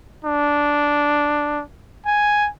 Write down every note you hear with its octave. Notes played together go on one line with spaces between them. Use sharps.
D4
G#5